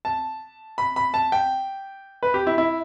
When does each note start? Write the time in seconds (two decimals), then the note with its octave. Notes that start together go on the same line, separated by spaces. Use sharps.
0.05 A5
0.78 B5
0.96 B5
1.14 A5
1.32 G5
2.23 B4
2.34 G4
2.47 E4
2.58 E4